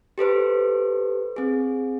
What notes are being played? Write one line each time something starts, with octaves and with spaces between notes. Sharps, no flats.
G4 A4 B4 C5
C4 G#4